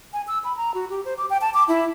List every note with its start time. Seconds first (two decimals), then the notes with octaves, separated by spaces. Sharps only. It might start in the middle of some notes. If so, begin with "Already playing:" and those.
0.13 G#5
0.28 E6
0.44 B5
0.57 A#5
0.74 F#4
0.90 G4
1.05 C5
1.18 D6
1.30 G5
1.41 A5
1.54 D6
1.68 E4